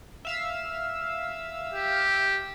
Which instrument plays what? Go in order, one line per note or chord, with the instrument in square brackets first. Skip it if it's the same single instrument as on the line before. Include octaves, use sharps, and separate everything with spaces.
[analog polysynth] E5 F5 E6
[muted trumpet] G4